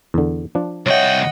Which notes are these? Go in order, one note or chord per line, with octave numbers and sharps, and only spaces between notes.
E2 D3
F3 D4
C2 C#5 D#5 E5 F#5 G5